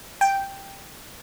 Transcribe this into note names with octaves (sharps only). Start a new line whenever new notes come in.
G5